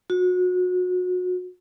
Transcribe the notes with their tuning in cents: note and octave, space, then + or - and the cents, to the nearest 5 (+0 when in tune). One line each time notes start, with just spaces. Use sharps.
F#4 -30